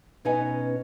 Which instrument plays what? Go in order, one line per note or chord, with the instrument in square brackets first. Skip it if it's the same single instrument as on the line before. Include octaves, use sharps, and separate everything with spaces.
[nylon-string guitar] B2 C#4 D#4 B4 D#5 G#5